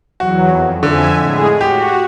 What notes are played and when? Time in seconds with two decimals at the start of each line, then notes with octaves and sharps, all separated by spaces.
0.20 E2 F#3 F#4
0.49 F2
0.83 F2 D3 E5 G#5
1.19 A2 G#3 G#4
1.61 F#4 G4